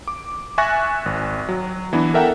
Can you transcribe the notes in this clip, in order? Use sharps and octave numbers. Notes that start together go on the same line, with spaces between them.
D6
E5 G#5 C#6 F#6 A6 A#6
G#1
F#3
E3 B3 D4 E4
A4 A#4 E5 F#5 G5 A#5